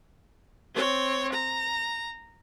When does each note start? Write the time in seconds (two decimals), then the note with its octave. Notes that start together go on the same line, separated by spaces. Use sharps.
0.74 C4 C#5
1.32 A#5